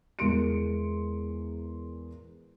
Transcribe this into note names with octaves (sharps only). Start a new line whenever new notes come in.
E2 G#3 A#4 C6 C#7 D7